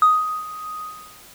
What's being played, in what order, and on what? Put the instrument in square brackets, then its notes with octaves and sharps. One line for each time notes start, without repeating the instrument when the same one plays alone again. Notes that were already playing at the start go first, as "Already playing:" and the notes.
[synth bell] D#6